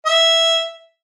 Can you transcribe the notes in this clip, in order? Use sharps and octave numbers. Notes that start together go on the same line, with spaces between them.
E5